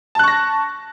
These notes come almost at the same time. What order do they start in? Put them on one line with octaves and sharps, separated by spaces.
A5 F#6 C#6 A#6